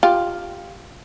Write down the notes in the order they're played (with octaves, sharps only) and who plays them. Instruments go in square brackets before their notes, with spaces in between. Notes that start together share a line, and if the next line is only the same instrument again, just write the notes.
[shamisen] F4 G4